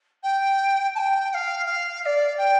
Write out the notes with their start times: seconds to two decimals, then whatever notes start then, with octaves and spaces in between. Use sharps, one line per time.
0.23 G5
0.95 A5
0.99 G5
1.30 G5
1.34 F5
1.66 F5
2.02 F5
2.06 D5
2.38 G5